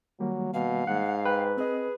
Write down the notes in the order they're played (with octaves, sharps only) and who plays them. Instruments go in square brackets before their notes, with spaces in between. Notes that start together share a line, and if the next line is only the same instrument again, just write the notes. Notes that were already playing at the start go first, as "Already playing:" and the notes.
[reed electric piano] D#3 G3 A#3 [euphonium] F#3
[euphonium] B2 [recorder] F5
[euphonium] G#2 [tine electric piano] F#5
[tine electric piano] B4 [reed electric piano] G5
[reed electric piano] C4 D#5 [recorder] G#4